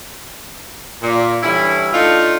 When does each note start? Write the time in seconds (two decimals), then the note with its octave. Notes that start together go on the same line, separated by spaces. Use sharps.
1.02 A#2
1.43 D3 E3 G3 C#4 E4
1.94 A3 D4 D#4 F4